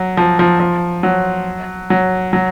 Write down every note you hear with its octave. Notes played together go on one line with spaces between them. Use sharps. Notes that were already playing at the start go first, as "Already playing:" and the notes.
Already playing: F#3
F3
F3
F3
F#3
F#3
F#3